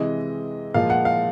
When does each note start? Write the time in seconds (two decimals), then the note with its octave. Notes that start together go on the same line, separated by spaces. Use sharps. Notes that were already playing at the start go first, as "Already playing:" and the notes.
Already playing: C3 E3 G#3 D#5
0.74 A#2 F3 G#3 F5
0.90 F#5
1.05 F5